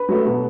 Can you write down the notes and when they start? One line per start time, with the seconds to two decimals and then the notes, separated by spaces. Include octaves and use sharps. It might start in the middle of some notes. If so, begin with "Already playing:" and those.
Already playing: B4 B5
0.08 F#3 A3
0.25 B2